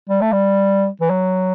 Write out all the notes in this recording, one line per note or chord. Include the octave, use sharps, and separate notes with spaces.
G3
A3
G3
E3
F#3